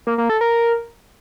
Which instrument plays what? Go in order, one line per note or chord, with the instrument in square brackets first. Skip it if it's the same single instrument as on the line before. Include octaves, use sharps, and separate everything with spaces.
[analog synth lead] A#3
A#3
A4
A#4